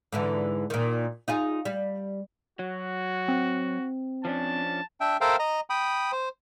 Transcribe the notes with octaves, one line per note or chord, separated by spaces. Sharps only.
G#2 D3 E3
A#2 D#3
D#4 F4 G#4
G3
F#3 F#4
C4
F3 C#4 D4 A5
D4 E5 G5
A4 A#4 C5 E5 F5 G5
D#5 A#5
G5 B5 D#6
C5